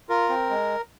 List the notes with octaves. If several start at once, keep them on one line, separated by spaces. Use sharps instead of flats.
F4 A#4
C4
G#3